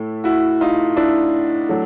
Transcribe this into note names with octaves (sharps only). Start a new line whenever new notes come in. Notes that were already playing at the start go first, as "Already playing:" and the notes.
Already playing: A2 A3 E4
E4 F#4
D#4 F4
D4 E4
F#3 A3